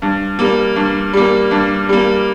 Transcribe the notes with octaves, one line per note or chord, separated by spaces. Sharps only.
G2
G3 A#3
G2
G3 A#3
G2
G3 A#3